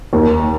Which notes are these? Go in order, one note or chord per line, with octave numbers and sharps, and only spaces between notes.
D#2